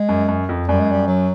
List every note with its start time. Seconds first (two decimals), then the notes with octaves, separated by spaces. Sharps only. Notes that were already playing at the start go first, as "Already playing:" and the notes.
Already playing: G#3
0.09 F#2
0.28 F#2
0.49 F2
0.68 F#2 G3
0.80 G#3
0.92 G3
1.08 F#3